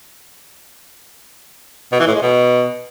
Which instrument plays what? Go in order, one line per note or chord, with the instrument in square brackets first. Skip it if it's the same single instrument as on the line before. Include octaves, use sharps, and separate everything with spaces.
[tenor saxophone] B2
E3
A2
G#3
B2